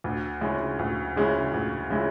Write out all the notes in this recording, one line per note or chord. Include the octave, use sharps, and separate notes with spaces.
D2
C#3 G#3 C#4 E4
D2
C#3 G#3 C#4 E4
D2
C#3 G#3 C#4 E4